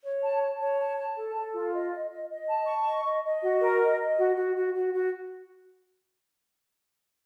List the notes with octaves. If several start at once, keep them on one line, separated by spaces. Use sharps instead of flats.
C#5
A5
A5
C#5
A5
A5
A4
A4
F4
D#5
D#5
D#5
D#5
A5
C#6
D#5
D#5
D#5
F#4
A#4
D#5
D#5
F#4
F#4
F#4
F#4
F#4